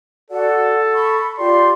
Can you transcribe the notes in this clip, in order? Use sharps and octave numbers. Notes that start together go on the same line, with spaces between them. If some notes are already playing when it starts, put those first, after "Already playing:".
F#4 A4 D5 F#5
B5 C#6
F4 G4 D5 C6